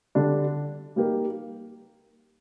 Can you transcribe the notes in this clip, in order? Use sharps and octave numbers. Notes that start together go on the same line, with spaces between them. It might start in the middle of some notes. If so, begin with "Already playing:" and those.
D3 G3 D4
G3 A#3 D#4 G4 A#4